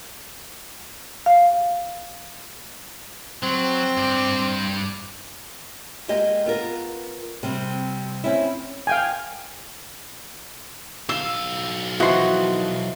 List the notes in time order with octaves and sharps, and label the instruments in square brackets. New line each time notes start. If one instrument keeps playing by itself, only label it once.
[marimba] F5
[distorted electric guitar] F#3 [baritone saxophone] C4
[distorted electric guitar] G2 D5
[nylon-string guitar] G#3 A#3 G4 D#5
B3 F4 A#4
C3 G3 C4
C4 C#4 E4
[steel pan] F5 G5 G#5
[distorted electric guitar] B1 F5 [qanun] C6 [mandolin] E6
[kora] E3 F3 [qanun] F#4 F#5 [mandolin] D#5 C6